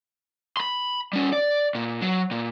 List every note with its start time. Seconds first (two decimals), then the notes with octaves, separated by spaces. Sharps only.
0.57 B5 C6
1.13 G3 C#4
1.33 D5
1.75 A#2
2.02 F#3
2.31 A#2